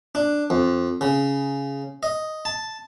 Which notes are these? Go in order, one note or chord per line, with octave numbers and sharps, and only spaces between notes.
D4
F2
C#3
D#5
A5